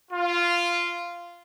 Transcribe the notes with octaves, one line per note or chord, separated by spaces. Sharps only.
F4